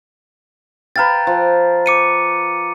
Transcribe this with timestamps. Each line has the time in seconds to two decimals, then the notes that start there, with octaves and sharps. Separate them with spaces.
0.96 B4 F5 G5 A#5 A6
1.27 F3
1.86 D6 C#7 D#7